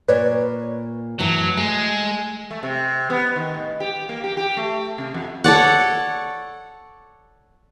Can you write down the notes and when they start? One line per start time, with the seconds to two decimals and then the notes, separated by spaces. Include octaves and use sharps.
0.08 A#2 B4 C#5 D5
1.19 F#2 A2 E3 F#3
1.57 G#3 A3
2.51 A3
2.63 C3
3.10 B3
3.36 D#3
3.54 A2
3.80 G4
4.09 A#3
4.24 G4
4.37 G4
4.57 A3
4.98 C3
5.14 F2
5.44 A4 C#5 D5 F#5